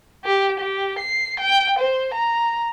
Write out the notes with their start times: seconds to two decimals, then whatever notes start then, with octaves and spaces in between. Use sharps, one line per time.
0.25 G4
0.59 G4
0.99 C7
1.40 G5
1.79 C5
2.14 A#5